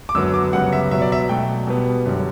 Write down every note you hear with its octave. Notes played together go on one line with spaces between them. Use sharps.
D6
F#2 D3 F#3 B3 E6
D6
F#2 C#3 G3 B3 F#5
E5
B2 F#3 B3 E5
D5
E5
B2 F#3 A3 G5
B2 G3 B3
F#2 D3 G3